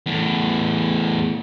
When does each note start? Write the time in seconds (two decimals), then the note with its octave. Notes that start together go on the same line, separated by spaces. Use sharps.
0.06 E2 A2